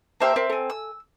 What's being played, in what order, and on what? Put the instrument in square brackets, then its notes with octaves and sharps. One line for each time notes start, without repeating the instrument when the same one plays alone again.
[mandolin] A#3 E5 C6 [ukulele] G4 C5 A5
[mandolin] C4 [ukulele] A#4 E5
[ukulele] A4 G#5
[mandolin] E6